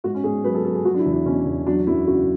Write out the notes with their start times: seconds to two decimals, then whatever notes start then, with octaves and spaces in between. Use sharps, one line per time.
0.04 G#2 F#4
0.14 C#4
0.24 G#2 G#4
0.44 F#3 B4
0.54 A4
0.65 F#3 A4
0.75 G#4
0.85 F#3 F#4
0.94 D4
0.99 E4
1.06 E2
1.12 E4
1.25 B2 C#4
1.46 E2
1.66 F#3 D4
1.87 F#2 E4
2.07 C#3 F#4